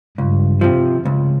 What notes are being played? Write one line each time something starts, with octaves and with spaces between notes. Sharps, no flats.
C#2 G2
C3 F3
C#2